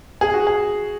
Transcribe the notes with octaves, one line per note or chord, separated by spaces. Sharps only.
G#4
F#4
G#4